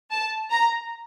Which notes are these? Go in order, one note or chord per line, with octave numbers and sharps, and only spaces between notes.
A5
A#5